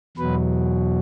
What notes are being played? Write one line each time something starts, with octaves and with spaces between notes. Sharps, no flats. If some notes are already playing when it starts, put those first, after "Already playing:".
E2 B2 F#3 B4